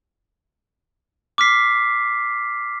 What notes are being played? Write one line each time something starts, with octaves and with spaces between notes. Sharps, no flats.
D6 F6 B6 C7